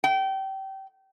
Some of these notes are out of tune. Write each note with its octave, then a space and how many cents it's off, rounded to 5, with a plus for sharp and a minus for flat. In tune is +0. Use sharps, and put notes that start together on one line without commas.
G5 -25